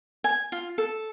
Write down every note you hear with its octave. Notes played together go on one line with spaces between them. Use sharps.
G#5
F4
A4